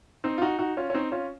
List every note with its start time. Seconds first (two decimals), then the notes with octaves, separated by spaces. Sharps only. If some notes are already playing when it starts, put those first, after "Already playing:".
0.24 C4 D#4
0.38 F4
0.42 D#4 F#4
0.59 D#4 F#4
0.77 C#4 F4
0.90 C#4
0.94 C4 D#4
1.12 C#4 F4